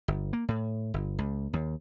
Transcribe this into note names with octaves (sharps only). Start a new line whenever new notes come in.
G1
A#3
A2
G1
C#2
D#2